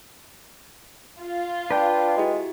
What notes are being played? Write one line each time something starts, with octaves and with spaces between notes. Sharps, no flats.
F4
D4 B4 G5
G#3 E4 F#4 G4